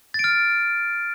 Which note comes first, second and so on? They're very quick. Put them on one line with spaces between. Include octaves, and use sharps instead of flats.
A6 D7 F6